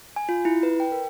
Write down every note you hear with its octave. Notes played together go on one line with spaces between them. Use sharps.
G#5
F4
E4
B4
G5
A#4